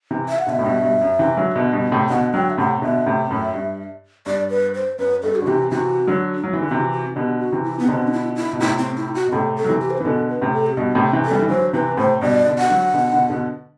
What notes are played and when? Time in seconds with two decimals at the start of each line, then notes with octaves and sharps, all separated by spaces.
0.11 C3 E3
0.28 E5
0.39 F#5
0.47 B2 D3 E5
0.59 A2
0.64 G2 B2
0.82 G2 B2
1.01 F#2
1.19 C3 E3
1.37 D3 F#3
1.55 B2 D3
1.73 G2 B2
1.92 A2 C3
2.10 B2 D3 F#5
2.34 D3 F#3 G5
2.50 E5
2.57 A2 C3 F#5
2.82 B2 D3 E5
3.06 A2 C3
3.30 F#2 A2
3.54 G2
4.26 G2 D5
4.50 B4
4.75 C5
4.99 F#2 B4
5.23 G2 A4
5.36 F#4
5.42 D3
5.47 C3 E3 G4
5.71 C3 E3 F#4
6.08 D3 F#3
6.36 D4
6.43 F#3 E4
6.53 E3
6.62 D3
6.68 C3 E3 F#4
6.92 F#4
7.16 B2 D3 G4
7.39 F#4
7.52 C3 E3
7.64 E4
7.79 B3
7.84 C3
7.88 B2 D3 C4
8.07 D4
8.13 E4
8.36 E4
8.53 B2
8.60 A2 C3 E4
8.78 C4
8.97 E4
9.15 F#4
9.27 B2
9.32 A2 C3 A4
9.56 A4
9.64 F#3
9.69 C3 E3
9.81 G4
9.90 C5
9.98 B4
10.00 E3
10.05 B2 D3 A4
10.29 B4
10.41 A2 C3
10.53 A4
10.67 G4
10.77 G2 B2 F#4
10.95 A2 C3
11.13 C3 E3
11.26 A4
11.31 E3 G3
11.42 E3
11.49 D3 F#3 C5
11.73 C3 E3 B4
11.97 A2 C3 C5
12.21 G2 B2 D5
12.46 B2 D3
12.58 F#5
12.70 D3 F#3
12.94 B2 D3
13.12 B2 D3
13.30 B2 D3